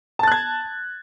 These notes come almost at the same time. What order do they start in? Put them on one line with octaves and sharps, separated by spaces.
A5 A6 F#6 G#6